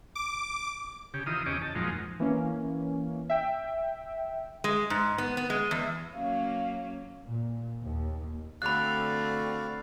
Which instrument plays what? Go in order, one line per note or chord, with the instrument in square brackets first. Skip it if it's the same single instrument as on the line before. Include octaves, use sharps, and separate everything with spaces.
[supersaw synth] D6
[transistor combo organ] C#3 G4
D#3 E3 F4 D#6
E2 C#3 C#4 G4 D#5 D6
A5
F2 A#2 F3 F#3 G#3 D#4
[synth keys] E3 A#3 C#4
E5 G5
[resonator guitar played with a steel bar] G#3
G#2
B3
B3
G#3
E2
[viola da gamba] F#3 A#3 C#4 [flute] F5
[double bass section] A#2
D#2
[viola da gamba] D3 A3 C4 [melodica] F#4 D5 F5 [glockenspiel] B5 F#6